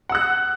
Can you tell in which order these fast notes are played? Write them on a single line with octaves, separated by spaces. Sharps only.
F#5 E6 F#6